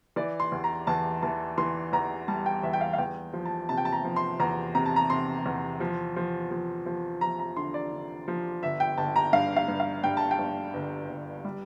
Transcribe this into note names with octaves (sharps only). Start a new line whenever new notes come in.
E3 D5
C6
E2
A#5
E2 A5
E3 A5
E3 C6
E2 A#5
G3 A5
G5
E2 E5
G5
F5
F5
E2 G5
F3
A5
C3 A5
G5
A5
A#5
F3
C6
E2 A#5
C3 A#5
A5
A#5
C3 C6
E2
F3
F3
F3
F3
F3 A#5
A#5
D3 C6
D5
D3
F3
G1 E5
G5
G1 A5
A#5
G2 F5
F5
G2
F5
G2 G5
A5
G5
G2
G1
G1
G3